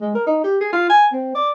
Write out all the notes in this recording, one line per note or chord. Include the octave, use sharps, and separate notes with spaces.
G#3
A#4
D#4
G4
G#4
F4
G#5
C4
D5